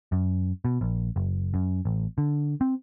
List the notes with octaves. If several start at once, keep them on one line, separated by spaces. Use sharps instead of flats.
F#2
B2
A#1
F#1
F#2
A1
D3
C4